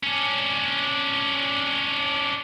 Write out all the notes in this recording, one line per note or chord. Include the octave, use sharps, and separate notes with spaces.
C#4 D4